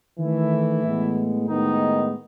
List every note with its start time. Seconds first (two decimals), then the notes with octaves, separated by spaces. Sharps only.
0.19 D#3 E3 A3 E4
0.83 A2 G#3 B3
1.48 A2 D#3 G#3 B3 D#4